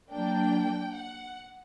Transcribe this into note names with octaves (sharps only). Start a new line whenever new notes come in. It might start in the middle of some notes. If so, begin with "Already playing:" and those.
F#3 A#3 D4 G5
F#5